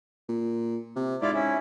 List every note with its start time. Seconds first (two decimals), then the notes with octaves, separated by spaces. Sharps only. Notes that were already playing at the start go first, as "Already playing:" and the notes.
0.29 A#2
0.96 C3
1.22 G#2 E4 F4 D5
1.34 C#4 E4